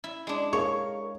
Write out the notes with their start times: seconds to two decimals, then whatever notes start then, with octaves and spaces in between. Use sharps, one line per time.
0.04 E4
0.27 G#3 D4
0.53 G#4 A#4 C#5 F5 C#6